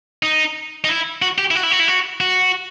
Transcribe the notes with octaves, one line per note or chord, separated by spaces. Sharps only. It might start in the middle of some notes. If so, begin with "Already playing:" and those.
D#4
D#4
E4
F#4
G4
E4
F#4
E4
F#4
E4
F#4
F#4